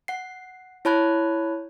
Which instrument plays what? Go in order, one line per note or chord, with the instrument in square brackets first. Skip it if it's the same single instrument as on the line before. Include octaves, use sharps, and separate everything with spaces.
[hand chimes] F#5 C7
E4 C#5 A5 B5 F#6 G#6